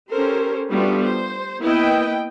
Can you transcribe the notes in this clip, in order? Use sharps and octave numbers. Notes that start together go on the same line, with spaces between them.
C#4 G4 A4 A#4 C5
G3 A3 B3 D4 F4 F#4
C5
A#3 B3 E4 B4 D#5 G5